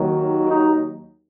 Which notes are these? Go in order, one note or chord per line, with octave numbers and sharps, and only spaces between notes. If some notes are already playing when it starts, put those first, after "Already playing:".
Already playing: D#2 D#3 F#3
D#4